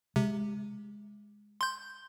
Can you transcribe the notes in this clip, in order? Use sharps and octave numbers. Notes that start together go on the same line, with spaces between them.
C3 G#3
C6 G6